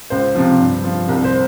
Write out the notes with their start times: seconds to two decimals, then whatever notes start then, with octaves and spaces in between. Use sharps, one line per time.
0.10 C#2 C5
0.35 C3 F3
0.60 G2
0.84 F3
1.09 C2
1.24 C5